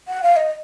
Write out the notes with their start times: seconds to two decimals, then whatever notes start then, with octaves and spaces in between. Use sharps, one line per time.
0.08 F#5
0.23 F5
0.36 D#5